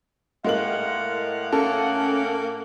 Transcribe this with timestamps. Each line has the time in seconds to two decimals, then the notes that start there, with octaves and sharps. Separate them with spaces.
0.45 A2 G#3 A#3 F5 F#5 F#7
1.52 A#3 C#4 A4